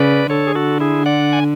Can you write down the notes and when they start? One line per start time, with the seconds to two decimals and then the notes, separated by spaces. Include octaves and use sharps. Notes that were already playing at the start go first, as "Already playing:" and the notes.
Already playing: C#3 B4 D5
0.30 D3 A4 C#5
0.47 G#4
0.55 F#4 A4
0.80 E4 G#4
1.06 D5 F#5
1.33 G#5